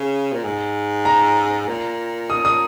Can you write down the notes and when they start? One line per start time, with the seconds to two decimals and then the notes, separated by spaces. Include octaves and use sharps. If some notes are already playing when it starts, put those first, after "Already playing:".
Already playing: C#3
0.33 A#2
0.44 G#2
1.05 A#5
1.68 A#2
2.30 D#6
2.45 D#6